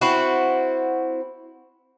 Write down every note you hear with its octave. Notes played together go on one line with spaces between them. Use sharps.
C4 E4 F#4